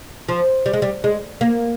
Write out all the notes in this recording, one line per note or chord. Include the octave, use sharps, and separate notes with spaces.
F3
G3
G#3
G3
G#3
A#3